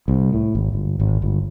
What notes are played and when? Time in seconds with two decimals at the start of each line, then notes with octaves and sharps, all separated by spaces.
0.08 C2
0.33 A2
0.55 G#1
0.73 G1
1.00 G#1
1.22 G1